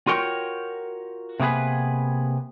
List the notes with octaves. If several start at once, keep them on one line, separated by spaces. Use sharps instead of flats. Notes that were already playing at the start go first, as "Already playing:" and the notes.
F4 F#4 A#4 C#5 G5
C3 A#3 B3 G#4 B4